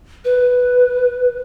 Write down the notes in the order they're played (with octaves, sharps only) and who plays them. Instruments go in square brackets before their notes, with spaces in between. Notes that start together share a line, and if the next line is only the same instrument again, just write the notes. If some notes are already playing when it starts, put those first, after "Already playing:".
[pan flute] B4